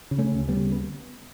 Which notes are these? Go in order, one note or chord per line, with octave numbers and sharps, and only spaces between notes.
C#3
A3 C#4
D2
G3 B3
C#3
B3